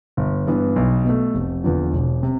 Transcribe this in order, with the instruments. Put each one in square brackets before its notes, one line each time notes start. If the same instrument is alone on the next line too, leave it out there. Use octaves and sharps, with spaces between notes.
[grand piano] G1
G2 E3 B3
B1
B2 A3
F1
E2 D3 F3
E1
C3